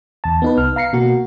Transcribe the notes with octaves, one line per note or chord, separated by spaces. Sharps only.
E2 A5
B3 D#4 B4
C2 F6
F5 A#5 C7 C#7
B2 A#3 F#4